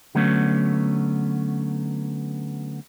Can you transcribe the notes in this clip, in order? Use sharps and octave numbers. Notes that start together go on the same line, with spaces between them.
D3 F#3 A3 B3 C#4